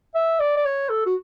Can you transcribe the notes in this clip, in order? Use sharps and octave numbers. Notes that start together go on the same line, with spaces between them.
E5
D5
D5
C#5
A4
F#4